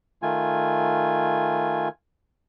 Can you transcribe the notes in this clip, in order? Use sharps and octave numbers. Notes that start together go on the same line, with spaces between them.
D#3 A3 F4 G#5